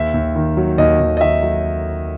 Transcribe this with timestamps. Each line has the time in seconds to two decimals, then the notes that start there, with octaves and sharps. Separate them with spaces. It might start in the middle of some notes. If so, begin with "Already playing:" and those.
Already playing: D#2 E5
0.14 D#2
0.35 D#3
0.57 F#3
0.78 D#2 D#5
1.00 D#2
1.17 D#5
1.21 D#3 E5
1.43 F#3